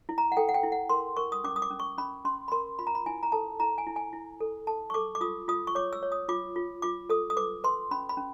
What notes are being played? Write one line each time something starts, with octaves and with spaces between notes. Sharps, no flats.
E4
A#5
F#5
A4 G5
F#5
G5
E4
F#5
A#4 C6
A#4 C#6
D#6
C#4 D6
D#6
D6
C#4
C#6
C#4 B5
C#4 C6
B5
A#4 C6
F4 B5
A#5
B5
E4 G#5
A#5
A4 A5
E4 A#5
G#5
E4
G#5
E4
A4
A4 A5
C#6
A4 D6
D6
F4 D#6
F4 D#6
C#6
C#5 D6
E6
C#5
D#6
F4 D6
F4
F4 D6
A4 D#6
D#6
B4 D6
B4 C6
C#4 B5
B5
C#4